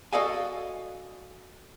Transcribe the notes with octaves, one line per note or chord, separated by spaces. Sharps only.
F#4 A4 D5 D#5 F5 G#5